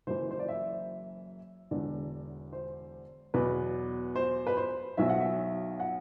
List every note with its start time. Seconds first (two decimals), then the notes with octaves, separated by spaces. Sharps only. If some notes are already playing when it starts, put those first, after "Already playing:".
0.07 F#1 F#2 E3 C5
0.31 C5
0.39 D5
0.48 E5
1.71 E1 E2 D3
2.53 C5
3.34 E2 B2 F#3 B4
4.16 C5
4.47 B4
4.57 C5
4.97 B1 B2 F#3 E5
5.09 F#5
5.20 E5
5.80 F#5